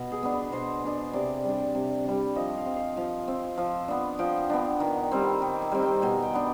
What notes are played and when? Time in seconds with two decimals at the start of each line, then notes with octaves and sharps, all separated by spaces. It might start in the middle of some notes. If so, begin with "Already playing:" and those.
Already playing: B2
0.12 G#4
0.23 B3 D4
0.32 B4
0.52 B2 C5
0.84 B3 D4
1.13 C3 D5
1.44 G3 D4
1.75 C3
2.05 G3 D4
2.35 F3 D#5
2.57 F5
2.66 C4
2.76 F5
2.96 F3 F5
3.28 C4
3.58 F3
3.88 B3 D4
4.19 F3 G5
4.50 B3 D4
4.80 D#3
5.11 G3 C4
5.42 D#3
5.62 G#5
5.72 G3 C4
5.82 G5
6.02 B2 G#5
6.22 G5
6.33 B3 D4